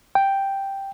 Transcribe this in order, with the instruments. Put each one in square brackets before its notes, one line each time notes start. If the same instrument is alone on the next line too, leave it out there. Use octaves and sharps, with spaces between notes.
[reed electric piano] G5